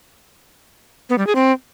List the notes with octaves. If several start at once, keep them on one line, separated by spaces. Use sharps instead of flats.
B3
G3
G#4
C4